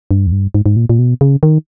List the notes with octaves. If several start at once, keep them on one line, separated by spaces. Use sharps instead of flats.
G2
E2
G2
G#2
G#2
A#2
A#2
B2
C#3
D#3